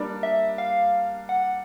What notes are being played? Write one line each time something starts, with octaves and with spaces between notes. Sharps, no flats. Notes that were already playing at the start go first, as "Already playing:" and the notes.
Already playing: G3 A#3 D4
E5
F5
F#5